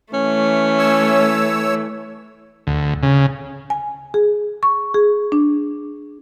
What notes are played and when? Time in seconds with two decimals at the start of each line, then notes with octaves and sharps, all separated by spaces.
0.13 E3 A3 C#4
0.78 C#5 E6
2.67 D2
3.03 C#3
3.70 G#5
4.14 G#4
4.63 C#6
4.94 G#4
5.32 D4